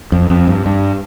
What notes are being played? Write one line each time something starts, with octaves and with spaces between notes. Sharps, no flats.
F2
F2
G2
G2